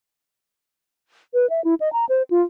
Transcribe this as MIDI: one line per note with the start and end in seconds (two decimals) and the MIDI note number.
1.34 1.49 71
1.50 1.63 76
1.64 1.74 64
1.80 1.91 75
1.93 2.05 82
2.09 2.22 72
2.30 2.41 65